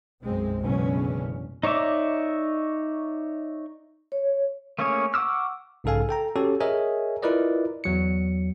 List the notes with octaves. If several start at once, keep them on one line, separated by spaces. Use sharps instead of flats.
B1 F#2 G#3 C4
F#1 B2 D3 E3 G#3 C#4
D#4 C#5 D5 E5 D6
C#5
A3 A#3 C#4 G#4 C#5
F#5 C#6 D6 E6 F6
B1 G#2 C#3 A4 F5 G#5
A4 G5 A#5
C#4 F#4 G4 A4 C#5
G#4 A#4 C#5 D#5 E5 G#5
E4 F4 A#4 B4 D5 D#5
E2 F#3 C#7